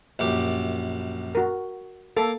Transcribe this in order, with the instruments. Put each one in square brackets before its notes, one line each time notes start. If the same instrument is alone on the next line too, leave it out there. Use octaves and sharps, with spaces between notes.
[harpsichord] A#1 F#2 G4
[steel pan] F#4 A#4
[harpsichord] A#3 [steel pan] A4